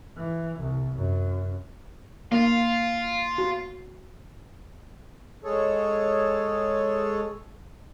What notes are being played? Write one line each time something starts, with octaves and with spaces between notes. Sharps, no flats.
E3
C2
F#2
A#3 F4
F#4
G#3 G#4 A4 C#5